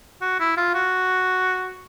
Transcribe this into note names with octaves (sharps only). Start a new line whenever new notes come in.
F#4
E4
F4
F#4